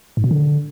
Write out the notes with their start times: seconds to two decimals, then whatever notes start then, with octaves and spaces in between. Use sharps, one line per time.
0.17 G#2
0.24 B2
0.31 D3